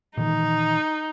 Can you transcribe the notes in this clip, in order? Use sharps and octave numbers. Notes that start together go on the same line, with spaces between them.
A#2 D#3 E3 D#4